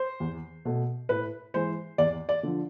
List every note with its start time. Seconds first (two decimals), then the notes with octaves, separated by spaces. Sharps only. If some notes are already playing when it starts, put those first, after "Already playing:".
Already playing: C5
0.20 E2
0.65 B2 A3
1.09 A2 B4
1.54 E3 G#3 C5
1.98 E2 D5
2.29 D5
2.43 D3 F3